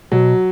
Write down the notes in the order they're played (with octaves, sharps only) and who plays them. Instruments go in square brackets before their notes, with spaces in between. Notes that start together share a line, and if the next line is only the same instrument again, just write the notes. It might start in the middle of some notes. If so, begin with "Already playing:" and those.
[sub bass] B2 [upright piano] F#3